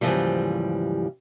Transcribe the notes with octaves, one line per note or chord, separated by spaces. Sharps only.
D#2 G#2 C#3 E3 F3 G3